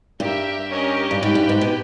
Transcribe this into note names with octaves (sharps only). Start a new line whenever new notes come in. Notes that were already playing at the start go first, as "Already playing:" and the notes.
G2 G4 A#4 E5
C#4 G4 A#4 D#5
G2
G#2 G4 B4 G5
G2
G#2
B2